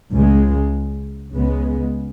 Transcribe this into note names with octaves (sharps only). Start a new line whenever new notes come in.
C#2 C#3 G#3
C#2 C#3 G#3 B3